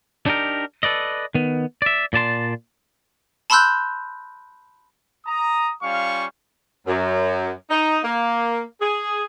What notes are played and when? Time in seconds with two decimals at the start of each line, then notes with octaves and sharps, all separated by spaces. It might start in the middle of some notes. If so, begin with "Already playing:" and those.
0.26 D4 D#4 G4 A#4
0.83 A4 B4 D5 D#5
1.35 D#3 B3
1.82 D5 E5
2.13 A#2 D5 A5 C6
3.50 A5 B5 C6 E6 F#6 G6
5.26 A#5 D#6
5.82 G3 C#4 F4 F5 C#6
6.87 F#2
7.70 D#4
8.03 A#3
8.81 G#4